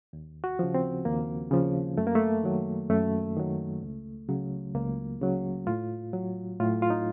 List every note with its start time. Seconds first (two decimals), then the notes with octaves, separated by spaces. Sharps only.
0.13 D#2
0.44 F#4
0.59 C#3 F3
0.74 C4
1.05 D#2 A#3
1.51 C#3 F3
1.98 F#2 A3
2.07 A#3
2.15 A3
2.43 D#3 F#3
2.90 F#2 A3
3.37 D#3 F#3
3.82 C#2
4.29 C#3 F#3
4.75 C#2 A#3
5.21 C#3 F#3
5.67 A2 F4
6.13 F#3
6.59 A2 F4
6.82 F4
6.90 D#4